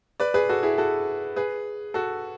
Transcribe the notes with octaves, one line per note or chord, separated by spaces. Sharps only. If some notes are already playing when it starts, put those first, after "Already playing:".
B4 D5
G#4 B4
F#4 A4
E4 G#4
F#4 A4
G#4 B4
F#4 A4